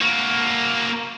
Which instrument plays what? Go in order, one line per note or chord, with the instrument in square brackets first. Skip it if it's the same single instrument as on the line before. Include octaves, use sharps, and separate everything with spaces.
[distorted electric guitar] A#3 F#4